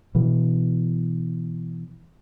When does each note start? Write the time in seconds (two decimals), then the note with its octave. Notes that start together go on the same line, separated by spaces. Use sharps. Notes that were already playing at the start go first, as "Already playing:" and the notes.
0.15 B2 E3